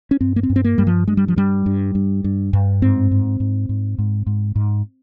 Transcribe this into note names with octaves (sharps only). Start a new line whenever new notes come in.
C#4
G2 C4
A#3
C4
G2
C4
A#3
G2 G3
F3
G2 G#3
G3
F3
G2 G3
G2
G2
G2
G2
G#2 C4
G#2
G#2
G#2
G#2
G#2
G#2